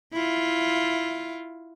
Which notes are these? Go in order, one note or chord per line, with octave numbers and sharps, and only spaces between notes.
E4 F4